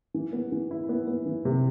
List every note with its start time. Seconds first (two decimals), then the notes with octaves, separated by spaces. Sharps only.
0.14 E3
0.33 B3
0.52 E3
0.71 E4
0.89 B3
1.07 B3
1.26 E3
1.45 C3